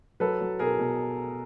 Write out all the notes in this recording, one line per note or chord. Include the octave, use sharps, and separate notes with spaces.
F#3 A4 B4
F#3
B2 G#4 A#4
B2